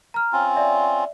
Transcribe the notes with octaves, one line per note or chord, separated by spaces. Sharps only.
A#5 F6
C4 C#4 F4
D5 E5